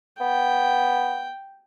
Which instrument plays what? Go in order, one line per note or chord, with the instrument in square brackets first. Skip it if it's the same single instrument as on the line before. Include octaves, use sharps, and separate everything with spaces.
[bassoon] B3 [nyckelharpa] G5